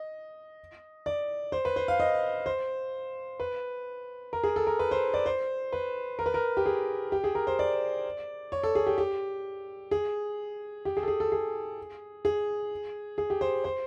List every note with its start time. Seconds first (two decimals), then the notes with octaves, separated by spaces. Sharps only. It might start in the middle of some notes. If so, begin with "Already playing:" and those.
Already playing: D#5
1.06 D5
1.52 C5
1.65 B4
1.76 C5
1.88 F5
2.00 D#5
2.46 C5
3.40 B4
4.33 A#4
4.43 G#4
4.56 A4
4.67 A#4
4.79 B4
4.91 C5
5.14 D5
5.26 C5
5.73 B4
6.19 A#4
6.26 B4
6.34 A#4
6.57 G4
6.66 G#4
7.12 G4
7.24 G#4
7.35 A#4
7.47 C5
7.59 D5
8.52 C#5
8.63 A4
8.75 G#4
8.87 G4
8.98 G4
9.91 G#4
10.85 G4
10.97 G#4
11.03 A4
11.08 G#4
11.20 A4
11.32 G#4
12.25 G#4
13.18 G#4
13.30 G4
13.41 C5
13.64 C5